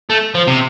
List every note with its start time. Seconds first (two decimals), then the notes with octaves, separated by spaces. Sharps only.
0.10 A3
0.35 F3
0.47 C3